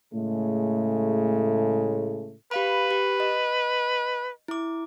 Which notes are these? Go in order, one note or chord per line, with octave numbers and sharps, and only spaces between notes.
A2 C#3 G#3 A3
G4 B4 F5 B5
G4
D#5
E4 D6